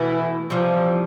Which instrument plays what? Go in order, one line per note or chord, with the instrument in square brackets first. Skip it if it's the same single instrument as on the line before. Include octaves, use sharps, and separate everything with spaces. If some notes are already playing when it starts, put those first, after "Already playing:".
Already playing: [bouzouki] B2 A3 E4 A4 [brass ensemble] E3
[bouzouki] C3 E3 G3 [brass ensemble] F3